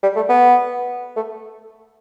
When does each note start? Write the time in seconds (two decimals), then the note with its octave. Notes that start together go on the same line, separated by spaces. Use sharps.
0.03 G3
0.16 A3
0.29 B3
1.16 A3